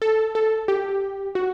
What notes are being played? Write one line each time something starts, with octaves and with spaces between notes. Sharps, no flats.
A4
A4
G4
F#4